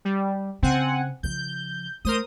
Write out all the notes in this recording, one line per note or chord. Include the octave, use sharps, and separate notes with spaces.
G3
C#3 C4 F#5 G#5
C#3 F3 G6
A3 A#4 C5 D#6